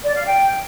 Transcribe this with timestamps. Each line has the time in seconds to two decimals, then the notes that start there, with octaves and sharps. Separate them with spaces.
0.04 D5
0.15 F5
0.26 G5